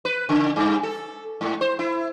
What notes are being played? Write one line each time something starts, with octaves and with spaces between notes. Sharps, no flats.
B4
C#3
G2
A4
G#2
C5
E4